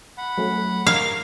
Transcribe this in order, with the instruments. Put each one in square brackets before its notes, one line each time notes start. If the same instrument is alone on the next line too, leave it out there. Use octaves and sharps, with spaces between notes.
[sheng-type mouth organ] F#5 B5
[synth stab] F#3 A3 C#4
[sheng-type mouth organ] A#4 [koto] F5 [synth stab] G#6